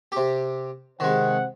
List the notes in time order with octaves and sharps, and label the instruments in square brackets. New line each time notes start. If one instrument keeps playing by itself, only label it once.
[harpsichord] C3 G4
[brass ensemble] C3 C5 F#5 [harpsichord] D#3 G#3